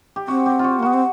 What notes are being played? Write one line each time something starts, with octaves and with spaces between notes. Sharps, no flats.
G4
C4 F#4
G4
F4 F#4
A#3
B3 F#4
C4